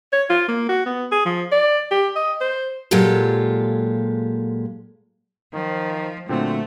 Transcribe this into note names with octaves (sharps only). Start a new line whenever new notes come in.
C#5
F4
A#3
F#4
B3
G#4
F3
D5
G4
D#5
C5
A#2 F#3 G#3 F4 G4 A4
D#3 F3
A#2 D3 F#3 A3 C4